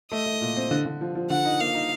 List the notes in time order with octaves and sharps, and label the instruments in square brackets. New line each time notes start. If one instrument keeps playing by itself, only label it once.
[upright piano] A3 [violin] D#5
[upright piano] A3
A#2
C4
D3
D3
F3
F3
[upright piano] D3 [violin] F#5
[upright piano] D#4
[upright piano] A#3 [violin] F5
[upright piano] D#4